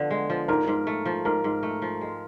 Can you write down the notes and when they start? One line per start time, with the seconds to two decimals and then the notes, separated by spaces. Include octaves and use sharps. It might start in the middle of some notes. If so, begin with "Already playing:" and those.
Already playing: D3 F3 B3
0.11 G#3
0.30 F3
0.48 G#2 A#4
0.68 G#2
0.87 A3
1.06 F3
1.25 G#2 A#4
1.44 G#2
1.63 A3
1.82 F3
2.01 G#3